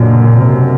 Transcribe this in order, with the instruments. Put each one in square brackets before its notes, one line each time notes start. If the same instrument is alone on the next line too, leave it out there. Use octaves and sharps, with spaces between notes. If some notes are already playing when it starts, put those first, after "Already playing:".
Already playing: [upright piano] F#1 F#2 D3 F#3 [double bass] A#2
[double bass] C3